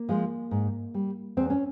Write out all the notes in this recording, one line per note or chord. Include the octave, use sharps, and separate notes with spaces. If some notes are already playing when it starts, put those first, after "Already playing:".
Already playing: A#3
F3 G#3
G#2
G3
E2 C4
C#4